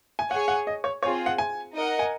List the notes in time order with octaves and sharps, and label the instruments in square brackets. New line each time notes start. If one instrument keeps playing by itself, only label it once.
[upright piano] G#5
[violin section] G#4 C#5 G#5 [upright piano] F#5
[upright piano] F#5
D#5
C#5
[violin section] C4 F4 G#4 [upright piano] C#5
[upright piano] F#5
G#5
[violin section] D#4 A#4 D#5 F#5
[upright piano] G#5